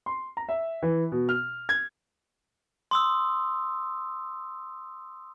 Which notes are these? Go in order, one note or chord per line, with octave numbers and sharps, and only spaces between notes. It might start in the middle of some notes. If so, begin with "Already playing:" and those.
C6
A#5
E5
E3
B2
F6
G#6
C6 D#6 E6